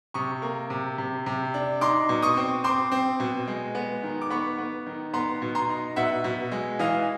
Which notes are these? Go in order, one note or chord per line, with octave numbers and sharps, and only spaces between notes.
C3 C#6 D#6
A#3
C3
C3
C3
D4
D#4 C6 D6
B2
C#6 D#6
C4
C4 C6 D6
C4
B2
G#3
B3
D#3
D6
B3 B5 C#6
B3
D#3
B3 A#5 C6
B2
A#5 C6
D#4
B2 E5 F#5
B2
G#3
E3 D#5 F5